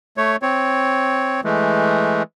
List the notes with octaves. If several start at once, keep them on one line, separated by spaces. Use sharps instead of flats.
A3 C#5
C4 C#5
E3 G#3 A3